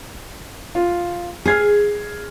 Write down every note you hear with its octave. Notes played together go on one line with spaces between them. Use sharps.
F4
G#4 F6 G#6 C7